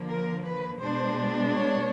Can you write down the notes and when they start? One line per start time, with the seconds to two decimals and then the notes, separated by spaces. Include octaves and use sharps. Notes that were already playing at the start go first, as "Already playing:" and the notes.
Already playing: D3 F3 A#3
0.10 A#4
0.45 B4
0.81 B2 G#3 B3 D4 C5
1.52 C#5